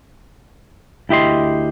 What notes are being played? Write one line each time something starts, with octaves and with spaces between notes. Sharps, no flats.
D2 E4 G4 D#5 C6